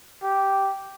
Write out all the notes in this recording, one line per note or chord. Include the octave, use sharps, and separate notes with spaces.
G4